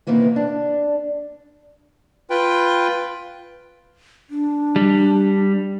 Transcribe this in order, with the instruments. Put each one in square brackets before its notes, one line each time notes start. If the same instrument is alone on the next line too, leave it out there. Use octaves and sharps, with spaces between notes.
[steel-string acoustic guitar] C3 D#3 E3 A#3 B3
D4
[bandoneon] F4 B4 G5
[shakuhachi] D4
[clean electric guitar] G3